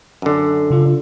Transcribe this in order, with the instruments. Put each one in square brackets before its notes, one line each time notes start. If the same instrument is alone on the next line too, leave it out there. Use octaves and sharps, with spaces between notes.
[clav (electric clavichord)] F#2 D3
[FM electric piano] C#3 D4 F4